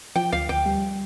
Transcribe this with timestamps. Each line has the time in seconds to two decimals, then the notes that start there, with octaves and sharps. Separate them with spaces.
0.16 F3 G5
0.32 D2 F5
0.49 D2 G5
0.66 G3